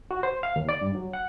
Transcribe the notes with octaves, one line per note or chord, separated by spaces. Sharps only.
F#4
C5
F5
D#2
D5
G2
F#3
F#5